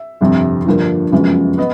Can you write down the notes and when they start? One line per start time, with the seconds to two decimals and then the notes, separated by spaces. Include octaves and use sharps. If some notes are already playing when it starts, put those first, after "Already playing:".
Already playing: E5
0.21 G1 F2 C3
0.66 G2 D3 F3 A#3
1.12 F#2 C#3 F3 G#3 B3
1.58 B3 D#5